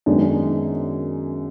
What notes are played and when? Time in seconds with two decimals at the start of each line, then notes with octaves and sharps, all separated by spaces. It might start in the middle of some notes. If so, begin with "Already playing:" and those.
0.06 F#2 D#3 G#3 B3 D4